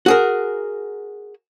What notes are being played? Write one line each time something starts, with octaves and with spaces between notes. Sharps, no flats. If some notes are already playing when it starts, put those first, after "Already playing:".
F#4 G#4 A#4